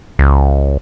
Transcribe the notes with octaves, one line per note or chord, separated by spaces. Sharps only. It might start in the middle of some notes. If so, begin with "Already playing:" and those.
C#2